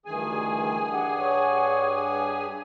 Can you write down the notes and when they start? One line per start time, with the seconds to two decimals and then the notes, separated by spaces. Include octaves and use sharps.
0.06 D2 G2 D#3 E3 G#4 G#5
0.92 D4 G4 F#5
1.18 C#5